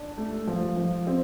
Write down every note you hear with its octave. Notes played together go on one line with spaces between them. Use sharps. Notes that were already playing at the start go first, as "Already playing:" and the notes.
Already playing: D4
A3
F3
F3
C4